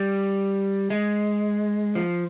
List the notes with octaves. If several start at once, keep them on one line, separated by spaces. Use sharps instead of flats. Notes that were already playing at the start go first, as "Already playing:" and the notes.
Already playing: G3
G#3
F3